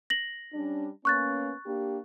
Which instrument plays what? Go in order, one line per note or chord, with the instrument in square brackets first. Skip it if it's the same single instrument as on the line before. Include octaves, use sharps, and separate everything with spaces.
[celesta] A#6 F#7
[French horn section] G3 C#4 D4
[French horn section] A#3 B3 C#4 [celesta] C#6 F#6 A6
[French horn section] A#3 D4 G4